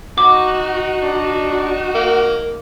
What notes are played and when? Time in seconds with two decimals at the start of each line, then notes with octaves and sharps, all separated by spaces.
0.18 D#4 F#4 D6
1.02 D4
1.94 A#3